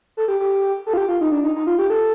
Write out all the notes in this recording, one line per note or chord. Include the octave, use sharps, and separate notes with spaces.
A4
G4
G4
A4
F4
G4
F4
D#4
D4
D#4
D#4
F4
G4
A4